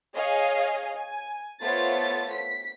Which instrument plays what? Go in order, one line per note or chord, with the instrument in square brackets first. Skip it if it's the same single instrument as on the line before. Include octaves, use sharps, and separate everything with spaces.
[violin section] G#4 C#5 D#5 F5 G#5
G#5
A3 B3 F4 C5 C#5 A6
B6